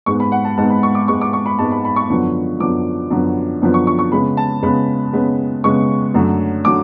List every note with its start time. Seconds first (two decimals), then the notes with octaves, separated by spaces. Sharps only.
0.06 G#2 G#3 B3 C#6
0.20 B5
0.32 F#5
0.45 A5
0.57 G#2 G#3 B3 A5
0.70 B5
0.83 C#6
0.95 D6
1.08 G#2 G#3 B3 C#6
1.21 D6
1.33 C#6
1.46 B5
1.59 G#2 G#3 B3 A5
1.71 B5
1.85 B5
1.96 C#6
2.10 F#2 D3 F3 B3
2.60 F#2 D3 F3 B3 D6
3.10 F#2 D3 F3 B3
3.62 F#2 D3 F3 B3
3.74 C#6
3.87 C#6
3.99 C#6
4.12 C#3 G#3 B3 B5
4.37 A5
4.63 C#3 G#3 B3 B5
5.13 C#3 G#3 B3
5.64 C#3 G#3 B3 C#6
6.14 F#2 D3 F#3 A3
6.65 D3 F#3 D6